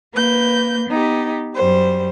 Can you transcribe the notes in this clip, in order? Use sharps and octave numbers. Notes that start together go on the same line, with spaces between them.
A#3 B4 G6
B3 D#4 G4
F#2 G3 C5